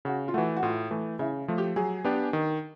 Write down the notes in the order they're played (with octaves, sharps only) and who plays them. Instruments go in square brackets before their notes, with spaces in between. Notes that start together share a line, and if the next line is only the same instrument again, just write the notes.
[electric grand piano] C#3 [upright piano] F#4
[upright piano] F4
[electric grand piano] E3 A3 [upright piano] F#4
[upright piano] F#4
[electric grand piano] A2 [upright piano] F4
[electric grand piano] E3 A3
[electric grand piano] C#3 [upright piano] E4
[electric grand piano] F3 A3
[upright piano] G4
[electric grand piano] F#3 [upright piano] G#4
[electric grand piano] B3 D4 G4
D#3